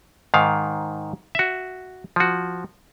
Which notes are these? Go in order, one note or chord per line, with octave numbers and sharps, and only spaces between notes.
G#2 D#3 F5
F#4 E5
F3 F#4